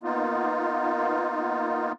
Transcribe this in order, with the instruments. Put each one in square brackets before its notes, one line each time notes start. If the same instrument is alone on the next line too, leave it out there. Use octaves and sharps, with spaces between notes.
[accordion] A#3 B3 D#4 F4